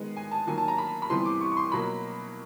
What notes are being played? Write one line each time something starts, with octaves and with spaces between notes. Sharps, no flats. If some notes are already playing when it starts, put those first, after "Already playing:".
Already playing: D#3 G#3 B3
G#5
A5
D#3 F#3 A#3 G#5
A5
A#5
B5
B5
C3 E3 G3 B3 C6
D6
C#6
C#6
C6
B2 F#3 A#3 B5